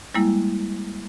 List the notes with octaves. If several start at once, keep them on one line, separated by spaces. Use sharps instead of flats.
G3 G#3 A#3 E4